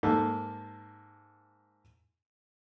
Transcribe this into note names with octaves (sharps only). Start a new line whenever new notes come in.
G#2 A#3 A4